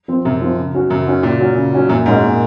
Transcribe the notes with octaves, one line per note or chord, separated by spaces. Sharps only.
F3 C4
F#2 C3
F3 C4
C#3
F#3 C#4 F#4
F#2 C#3
F#3 C#4 F#4
A#2 C#3
F#3 C#4 F#4
C#3
F#3 C#4 F#4
F#2 A#2
G#2 G#3 C#4 F#4
A#2